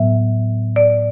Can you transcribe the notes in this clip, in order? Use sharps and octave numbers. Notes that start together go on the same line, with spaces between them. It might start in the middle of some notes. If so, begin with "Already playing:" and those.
Already playing: A2 F#3 B3 E5
D5